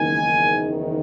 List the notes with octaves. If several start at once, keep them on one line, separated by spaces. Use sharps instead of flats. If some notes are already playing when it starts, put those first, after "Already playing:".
Already playing: F#1 E2 D#3 G#5